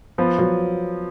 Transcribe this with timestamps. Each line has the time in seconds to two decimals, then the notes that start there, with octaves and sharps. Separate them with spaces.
0.18 F3 B3
0.39 F#3